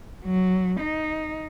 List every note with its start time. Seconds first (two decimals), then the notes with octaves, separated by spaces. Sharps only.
0.25 F#3
0.80 D#4